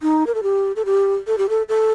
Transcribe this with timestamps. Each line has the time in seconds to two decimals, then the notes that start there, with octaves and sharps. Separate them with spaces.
0.02 D#4
0.27 A#4
0.35 A4
0.43 G4
0.76 A4
0.85 G4
1.27 A4
1.38 G4
1.49 A4
1.69 A4